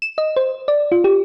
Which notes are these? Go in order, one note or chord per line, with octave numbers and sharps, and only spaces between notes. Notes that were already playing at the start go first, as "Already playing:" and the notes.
E7
D#5
C5
D5
F4
G4